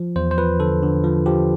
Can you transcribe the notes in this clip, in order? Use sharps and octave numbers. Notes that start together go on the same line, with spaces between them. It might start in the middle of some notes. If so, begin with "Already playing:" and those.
Already playing: F3
E2 C5
C5
F3 B4
D3 A4
D3
F3
F3 G4